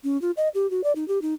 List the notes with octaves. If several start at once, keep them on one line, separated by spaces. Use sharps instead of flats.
C#4
F4
D#5
G4
F#4
D5
D#4
G4
D#4